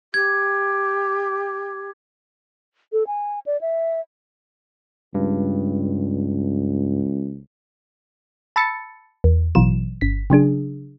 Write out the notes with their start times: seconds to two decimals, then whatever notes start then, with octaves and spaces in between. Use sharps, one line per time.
0.14 G4 G#6
2.93 A4
3.07 G#5
3.46 D5
3.61 E5
5.14 C#2 G2
8.56 A5 B5 E6 A6 C#7
9.24 E2
9.55 A1 B2 E3 F#3 E7
10.01 G1 B6
10.30 C#3 F#3 D4 G#4